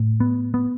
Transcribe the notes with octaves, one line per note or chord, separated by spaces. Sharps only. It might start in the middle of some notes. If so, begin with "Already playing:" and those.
Already playing: A2
B3
B3